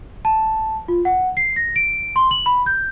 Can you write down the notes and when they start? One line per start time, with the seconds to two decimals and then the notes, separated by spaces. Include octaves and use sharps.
0.25 A5
0.88 F4
1.05 F#5
1.37 C7
1.56 A#6
1.76 D7
2.16 C6
2.31 F#7
2.46 B5
2.66 G6